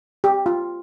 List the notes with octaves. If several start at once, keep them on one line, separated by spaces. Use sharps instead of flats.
G4
F4